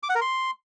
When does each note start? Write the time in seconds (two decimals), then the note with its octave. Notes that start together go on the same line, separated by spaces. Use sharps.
0.03 D6
0.09 F#5
0.15 A#4
0.21 C6